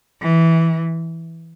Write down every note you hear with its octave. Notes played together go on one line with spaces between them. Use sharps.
E3